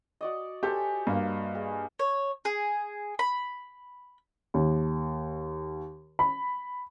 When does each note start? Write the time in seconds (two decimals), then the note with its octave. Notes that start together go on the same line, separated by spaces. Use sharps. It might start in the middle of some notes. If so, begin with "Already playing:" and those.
0.21 F#4 D5 D#5
0.63 F#4 G4 A4 C5 G#5
1.07 G2 A#3
1.55 G#4
1.99 C#5
2.45 G#4
3.19 B5
4.54 D#2
6.19 B5